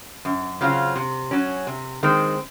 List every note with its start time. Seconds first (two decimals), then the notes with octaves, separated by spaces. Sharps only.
0.25 F#2
0.61 C#3 F#3 C4 F4
0.96 C3
1.31 F#3 C#4
1.67 C3
2.03 D#3 G#3 C4